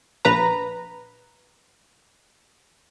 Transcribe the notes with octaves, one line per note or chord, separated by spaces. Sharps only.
A#1 B4 A#5